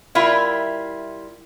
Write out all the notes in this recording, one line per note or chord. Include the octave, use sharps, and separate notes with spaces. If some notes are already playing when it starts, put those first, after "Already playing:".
G3 E4 F4 A#4 E5